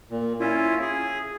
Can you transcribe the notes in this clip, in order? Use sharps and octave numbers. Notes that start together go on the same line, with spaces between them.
A#2
C#4 E4 F4
G#4